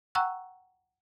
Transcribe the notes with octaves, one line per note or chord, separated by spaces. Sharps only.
F#5 G5 A#5 C#6 E6 F#6